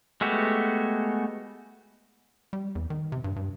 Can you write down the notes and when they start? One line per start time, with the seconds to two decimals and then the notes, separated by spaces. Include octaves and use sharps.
0.21 G#3 A3 B3 F#4 G4
2.53 G3
2.75 E2
2.90 D#3
3.12 C3
3.24 G2
3.36 G2